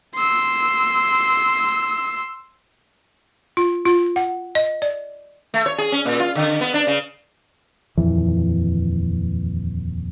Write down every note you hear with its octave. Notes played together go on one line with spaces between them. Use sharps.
C6 E6
F4
F4
F#5
D#5
D5
A3
C#5
G#4
C#4
A#2
F4
D3
B3
D4
C#3
D#1 F2 E3